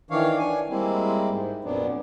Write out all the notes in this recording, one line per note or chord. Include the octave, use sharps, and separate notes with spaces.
D#3 E3 D4 C#5 F5
D4 G#5
G3 G#3 A#3 C4 E4
G#2
F2 A#2 F#3 B3 D4